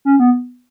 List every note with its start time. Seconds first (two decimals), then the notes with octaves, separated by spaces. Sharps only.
0.05 C#4
0.20 B3